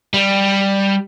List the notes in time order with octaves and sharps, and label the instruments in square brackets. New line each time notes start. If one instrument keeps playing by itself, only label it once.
[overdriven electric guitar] G3